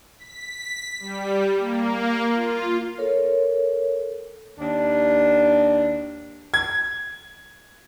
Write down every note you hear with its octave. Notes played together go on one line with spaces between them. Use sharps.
B6
G3
A#3
F4
A4 A#4 C#5
D#2 D4
G#6